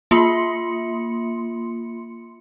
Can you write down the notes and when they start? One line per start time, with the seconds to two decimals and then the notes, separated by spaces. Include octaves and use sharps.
0.11 A#3 F4 C6 C#7